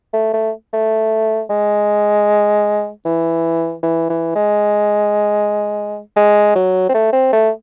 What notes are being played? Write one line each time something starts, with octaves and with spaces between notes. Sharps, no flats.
A3
A3
A3
G#3
E3
E3
E3
G#3
G#3
F#3
C4
A3
C4
A3